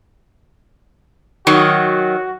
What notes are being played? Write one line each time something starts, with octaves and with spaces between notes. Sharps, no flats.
D#3 F#3 F#4